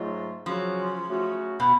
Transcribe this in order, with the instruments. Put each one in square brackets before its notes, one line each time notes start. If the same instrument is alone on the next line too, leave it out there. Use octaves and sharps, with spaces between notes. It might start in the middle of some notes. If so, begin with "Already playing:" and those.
Already playing: [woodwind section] G#2 F#3 A3 F4
[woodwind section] C#3 F#3 C#4 F#4 [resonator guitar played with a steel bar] F3
[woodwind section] C#3 F#3 A3 C#4 F#4
[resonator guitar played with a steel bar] B2